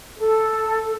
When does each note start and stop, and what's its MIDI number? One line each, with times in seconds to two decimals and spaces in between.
0.18 0.94 69